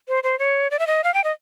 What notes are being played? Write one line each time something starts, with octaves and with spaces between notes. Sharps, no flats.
C5
C5
C#5
D5
E5
D#5
F5
G5
D#5